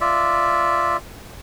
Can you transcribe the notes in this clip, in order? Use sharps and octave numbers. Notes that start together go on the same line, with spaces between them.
F4 D5 E5